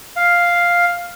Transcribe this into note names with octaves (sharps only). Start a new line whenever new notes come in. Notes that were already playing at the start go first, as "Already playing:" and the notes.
F5